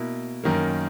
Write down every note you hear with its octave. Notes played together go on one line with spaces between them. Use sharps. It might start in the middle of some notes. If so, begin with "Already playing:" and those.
Already playing: B2 A#3 E4
F#2 D#3 A#3